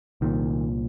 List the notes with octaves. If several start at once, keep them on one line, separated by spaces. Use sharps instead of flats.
C2 A#2 D#3